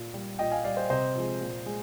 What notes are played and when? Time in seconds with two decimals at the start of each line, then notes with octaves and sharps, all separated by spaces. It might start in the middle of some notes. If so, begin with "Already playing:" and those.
Already playing: A#2
0.14 G3
0.39 A#2 D#5 G5
0.52 F5 G#5
0.64 G3 D5 F5
0.77 C5 D#5
0.90 C3 C5 D#5
1.15 F3 G#3
1.41 A#2
1.66 G#3